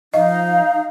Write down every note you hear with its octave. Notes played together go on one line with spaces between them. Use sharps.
F3 D#4 D#5 F5